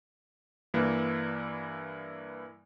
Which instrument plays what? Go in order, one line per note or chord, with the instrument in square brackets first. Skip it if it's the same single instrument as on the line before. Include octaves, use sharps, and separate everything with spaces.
[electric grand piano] G2 E3 A#3